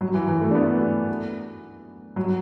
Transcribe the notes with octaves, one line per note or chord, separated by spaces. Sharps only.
F#3
E3
E3
A3
D4
B3
F#3